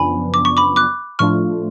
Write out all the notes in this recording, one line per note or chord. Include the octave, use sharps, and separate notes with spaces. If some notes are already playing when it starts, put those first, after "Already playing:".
Already playing: F#2 C#3 F3 B3 D4 G#5 B5
D6
C#6
B5 D6
D6 F#6
A2 F3 A3 D4 F4 C#6 F6